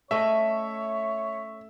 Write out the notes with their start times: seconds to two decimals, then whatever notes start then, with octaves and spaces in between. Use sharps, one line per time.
0.11 A3 C#4 C#5 D#5 E5